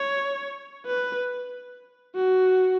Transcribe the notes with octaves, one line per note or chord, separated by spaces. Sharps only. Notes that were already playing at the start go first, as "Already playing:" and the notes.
Already playing: C#5
B4
F#4